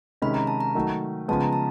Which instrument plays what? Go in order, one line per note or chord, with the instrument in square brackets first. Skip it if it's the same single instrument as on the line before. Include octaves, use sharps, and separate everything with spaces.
[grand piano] C3 D#3 G#3 C#4 [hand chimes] B5
[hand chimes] A#5
A5
A#5
[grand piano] D#3 F#3 A3
[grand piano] C#3 F3 G#3 B3 [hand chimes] A5
[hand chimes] A#5
A5